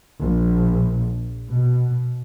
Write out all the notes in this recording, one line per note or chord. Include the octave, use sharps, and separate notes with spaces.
A#1
B2